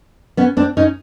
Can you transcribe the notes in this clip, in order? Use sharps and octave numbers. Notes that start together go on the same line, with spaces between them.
B3 C#4
C4 D4
C#4 D#4